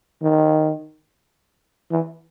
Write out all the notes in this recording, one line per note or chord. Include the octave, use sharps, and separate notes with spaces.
D#3
E3